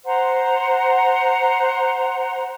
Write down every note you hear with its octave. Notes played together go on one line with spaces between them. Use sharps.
C5 F#5 A#5 C6